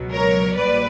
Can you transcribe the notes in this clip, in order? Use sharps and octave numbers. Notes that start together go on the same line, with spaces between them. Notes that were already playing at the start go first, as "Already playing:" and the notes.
Already playing: C#2 B2 F#3
A#4 C#5
A#1 A#2 G3 B4 D5